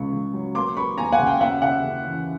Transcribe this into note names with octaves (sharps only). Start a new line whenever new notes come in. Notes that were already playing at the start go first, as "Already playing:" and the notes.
Already playing: C#2 C#3 C#6
C#2
F#3
A#3 C6 D6
A#3 B5 C#6
D#2 G#5 A#5
F#5 G#5
C#3
F5 G5
F#2 E5 F#5
F#1 E5 F#5
C#3
E3